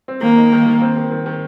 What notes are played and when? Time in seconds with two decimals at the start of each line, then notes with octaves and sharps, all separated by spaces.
0.08 C4
0.22 D#3 A#3
0.37 D#4
0.52 D#3
0.66 D#3
0.82 C4
0.96 D#3
1.11 D#3
1.26 D#3